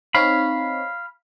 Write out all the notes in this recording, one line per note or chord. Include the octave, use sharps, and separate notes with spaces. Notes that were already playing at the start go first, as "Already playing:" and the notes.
C4 D#4 C#5 F5 B5